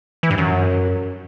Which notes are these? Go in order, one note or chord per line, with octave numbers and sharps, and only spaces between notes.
E3
G2
F#2